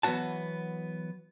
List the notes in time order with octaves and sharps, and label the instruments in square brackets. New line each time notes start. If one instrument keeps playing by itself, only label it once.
[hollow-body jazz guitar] E3 F#3 B3 C4 F#4 A5